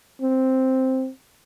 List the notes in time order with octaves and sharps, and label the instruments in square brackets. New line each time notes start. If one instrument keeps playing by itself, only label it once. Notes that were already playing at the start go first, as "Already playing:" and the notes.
[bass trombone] C4